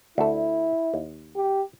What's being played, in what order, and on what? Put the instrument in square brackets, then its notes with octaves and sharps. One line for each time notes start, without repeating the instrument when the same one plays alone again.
[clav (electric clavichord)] D2 A4 [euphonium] E4
[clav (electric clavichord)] D#2
[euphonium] G4